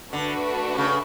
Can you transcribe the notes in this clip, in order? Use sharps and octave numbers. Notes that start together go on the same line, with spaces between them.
D3 A3 D4 F#4 B4
C3
C#3